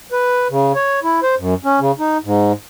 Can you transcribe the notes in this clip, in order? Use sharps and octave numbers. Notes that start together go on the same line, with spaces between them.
B4
C#3
C#5
E4
C5
F#2
C#4
C#3
D#4
G#2